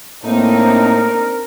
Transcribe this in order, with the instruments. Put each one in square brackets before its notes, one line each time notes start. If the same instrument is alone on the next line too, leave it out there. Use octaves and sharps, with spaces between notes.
[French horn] A2 [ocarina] A#3 [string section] C4 D4 D#4 [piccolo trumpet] A#4